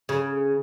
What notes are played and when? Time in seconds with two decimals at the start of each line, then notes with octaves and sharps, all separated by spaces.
0.09 C#3